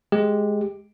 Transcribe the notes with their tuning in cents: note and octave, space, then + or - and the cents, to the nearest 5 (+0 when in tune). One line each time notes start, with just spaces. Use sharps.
G#3 +5 G4 +15